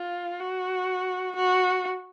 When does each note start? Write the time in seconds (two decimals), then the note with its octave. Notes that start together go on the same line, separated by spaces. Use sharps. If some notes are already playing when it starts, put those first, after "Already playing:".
Already playing: F4
0.39 F#4
1.36 F#4